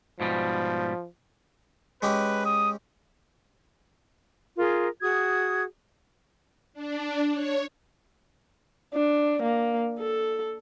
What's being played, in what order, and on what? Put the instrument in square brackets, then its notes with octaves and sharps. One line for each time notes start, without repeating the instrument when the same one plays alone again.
[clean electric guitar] G#2 B2 G3 [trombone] F3
[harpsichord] G#3 C#4 G4 [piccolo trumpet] B4
[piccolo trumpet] D#6
[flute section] F4 G#4 A#4
F#4 G#4 D#6 G#6
[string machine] D4
C#5
[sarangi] D4
A#3
A4